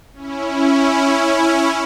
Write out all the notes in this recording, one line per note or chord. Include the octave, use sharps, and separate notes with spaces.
C#4 E4